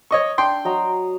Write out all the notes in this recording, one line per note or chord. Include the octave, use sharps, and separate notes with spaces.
C#5 D#5 C#6 E6
D4 G5 C6
F#3 D#5 A#5